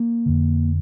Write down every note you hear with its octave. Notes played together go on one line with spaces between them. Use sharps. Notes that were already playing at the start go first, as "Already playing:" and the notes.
Already playing: A#3
F2 D3